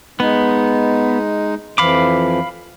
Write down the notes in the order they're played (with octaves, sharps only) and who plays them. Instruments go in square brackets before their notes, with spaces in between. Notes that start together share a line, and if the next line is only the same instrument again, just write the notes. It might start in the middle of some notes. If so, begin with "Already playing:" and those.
[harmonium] G#3 D#4 [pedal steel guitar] B3
[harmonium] F2 E3 F3 [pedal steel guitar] F5 B5 D6